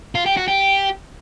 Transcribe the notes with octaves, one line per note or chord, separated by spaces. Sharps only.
F4
G4
F#4
G4